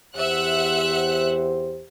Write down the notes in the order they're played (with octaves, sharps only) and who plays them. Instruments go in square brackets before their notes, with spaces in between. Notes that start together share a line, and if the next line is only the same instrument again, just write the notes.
[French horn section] E2 G4 C5 [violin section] E5 F#5 F#6